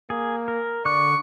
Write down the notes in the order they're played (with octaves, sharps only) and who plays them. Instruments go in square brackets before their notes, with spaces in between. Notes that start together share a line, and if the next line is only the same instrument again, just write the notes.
[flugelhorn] A#3 [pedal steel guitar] G#4
[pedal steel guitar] A#4
[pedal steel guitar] D3 D6 F#6 [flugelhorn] D5 [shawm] C#6